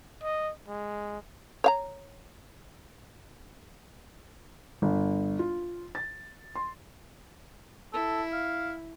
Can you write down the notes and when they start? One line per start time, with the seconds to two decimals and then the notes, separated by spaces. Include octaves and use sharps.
0.23 D#5
0.68 G#3
1.64 C#5 F5 A#5
4.82 G1
5.39 F4
5.95 A6
6.55 C6
7.93 E4 A4
8.33 F5